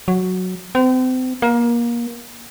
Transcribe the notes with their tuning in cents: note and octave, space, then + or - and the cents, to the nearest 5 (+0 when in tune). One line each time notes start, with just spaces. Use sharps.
F#3 -5
C4 -35
A#3 +25